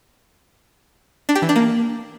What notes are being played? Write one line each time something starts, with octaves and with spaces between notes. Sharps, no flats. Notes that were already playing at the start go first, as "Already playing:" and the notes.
D4
G4
E3
D4
A#3